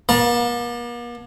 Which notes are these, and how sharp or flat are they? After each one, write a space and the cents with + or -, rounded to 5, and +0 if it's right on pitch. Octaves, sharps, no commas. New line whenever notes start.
A#3 +45 A5 +0